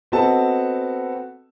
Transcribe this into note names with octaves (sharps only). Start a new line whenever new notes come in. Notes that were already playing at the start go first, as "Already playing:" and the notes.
B3 C4 F#4 A4 D#5 A5